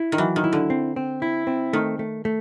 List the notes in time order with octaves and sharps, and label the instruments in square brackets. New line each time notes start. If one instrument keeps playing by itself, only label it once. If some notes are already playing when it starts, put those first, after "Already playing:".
Already playing: [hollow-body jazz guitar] E4
[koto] D#3
[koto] E3 [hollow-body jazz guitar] F#3
[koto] D#3
[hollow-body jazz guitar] E4
[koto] D3
[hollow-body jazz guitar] C4
C4
E4
C4
[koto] D#3 [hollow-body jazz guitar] A3
[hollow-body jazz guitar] A3
A3